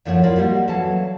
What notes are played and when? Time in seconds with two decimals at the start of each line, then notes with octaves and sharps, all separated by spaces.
0.05 F#2 A2 F3 A3 C#5 F#5
0.23 E4 F4 A#4 B4 D5 D#5
0.36 G3 A#3 G4 D#5 F#5
0.68 E3 F#3 A4 F5 A5